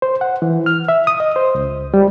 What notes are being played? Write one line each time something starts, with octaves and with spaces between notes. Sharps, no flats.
C5
F#5
E3
F6
E5
D#6
D#5
C5
C#2
G3